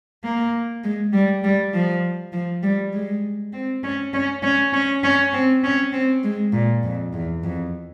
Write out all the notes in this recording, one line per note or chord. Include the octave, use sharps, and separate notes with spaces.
A#3
G#3
G3
G3
F3
F3
G3
G#3
C4
C#4
C#4
C#4
C#4
C#4
C4
C#4
C4
G#3
A#2
F2
E2
F2